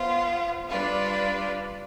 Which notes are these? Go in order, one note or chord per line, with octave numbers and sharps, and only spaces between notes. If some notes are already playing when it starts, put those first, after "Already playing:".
Already playing: B3 F4 C5
G3 D4 F4 B4